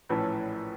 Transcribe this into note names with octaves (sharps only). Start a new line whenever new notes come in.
A#1 A2 E3 A3 C#4 B4